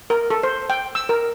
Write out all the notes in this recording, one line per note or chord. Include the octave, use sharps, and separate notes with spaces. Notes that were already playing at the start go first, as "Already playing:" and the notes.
A#4
A4
C5
G5
E6
A#4